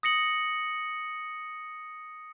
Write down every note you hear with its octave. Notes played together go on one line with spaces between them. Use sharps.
D#6 A#6 C#7 F#7